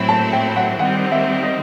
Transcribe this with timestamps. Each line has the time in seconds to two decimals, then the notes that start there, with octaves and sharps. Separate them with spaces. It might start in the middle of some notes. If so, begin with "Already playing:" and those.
Already playing: A2 F#3 C4 E4
0.09 A5
0.33 G5
0.56 F#5
0.79 D#3 G3 C4 F#5
1.12 E5
1.43 D#5